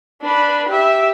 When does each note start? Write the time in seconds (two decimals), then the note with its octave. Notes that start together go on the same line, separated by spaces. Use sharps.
0.21 D4 B4
0.69 G4 E5